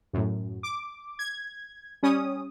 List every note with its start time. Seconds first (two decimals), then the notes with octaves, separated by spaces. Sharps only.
0.13 F#2 A2
0.63 D6
1.19 G#6
2.03 G3 C#4 D#6